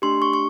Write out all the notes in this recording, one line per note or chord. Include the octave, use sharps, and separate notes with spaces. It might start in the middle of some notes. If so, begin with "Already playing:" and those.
A3 D4 G4 C6
C#6
C#6